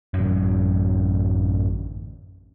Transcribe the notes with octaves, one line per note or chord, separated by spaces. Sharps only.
A1 F#2